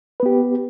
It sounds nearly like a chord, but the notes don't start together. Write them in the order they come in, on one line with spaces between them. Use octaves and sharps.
B4 B3 G4